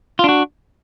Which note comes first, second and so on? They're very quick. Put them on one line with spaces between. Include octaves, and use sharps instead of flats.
F4 D4 F#4